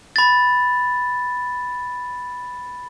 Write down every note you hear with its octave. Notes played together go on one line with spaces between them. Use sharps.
B5 A6